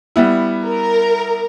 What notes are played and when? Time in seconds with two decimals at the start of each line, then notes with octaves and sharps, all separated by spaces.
0.16 G3 B3 E4
0.65 A#4